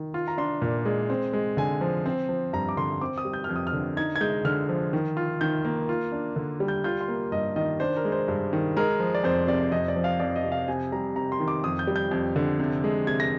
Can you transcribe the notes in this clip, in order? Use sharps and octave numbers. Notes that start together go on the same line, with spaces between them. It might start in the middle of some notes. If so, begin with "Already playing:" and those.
Already playing: D#3
F4
A#5
D4 C6
A#2
G#3
C4
G#3
D3 G#5
F3
C4
F3
G2 A#5
D6
D3 C6
C4 D6
D#6
G3
G6
F2 F6
D#6
F6
D3
D#4 G#6
G#6
G#3 G6
D3 F6
F3
D#3
F4
D#3 G6
A#3
F4
D4
D3
G3
G6
F4 G6
C6
A#3
G2 D#5
D#3 D#5
D4 C5
A#4
G#3
C5
G2
D#3
G#3 A#4
F3
D5
F2 C5
C3 D5
F2 D#5
D5
F3
F5
F2 D5
D#5
C3
F5
C3 G#5
G3 A#5
C3 A#5
C6
D#3
D6
F2 D#6
G6
G3
G6
F2
D3
C3
G#3
C3 G#6
A#6